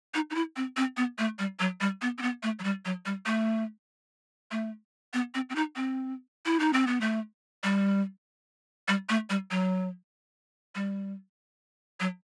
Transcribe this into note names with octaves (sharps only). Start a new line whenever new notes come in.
D#4
D#4
E4
C4
C4
B3
A3
G3
F#3
G3
B3
C4
B3
A3
F#3
G3
F#3
G3
A3
A3
B3
C4
C4
D#4
C4
E4
D#4
C4
B3
A3
G3
G3
A3
G3
F#3
G3
F#3